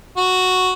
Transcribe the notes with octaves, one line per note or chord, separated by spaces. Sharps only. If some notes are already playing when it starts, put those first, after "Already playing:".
F#4